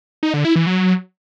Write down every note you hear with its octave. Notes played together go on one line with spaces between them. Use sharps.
D#4
D3
E4
E3
F#3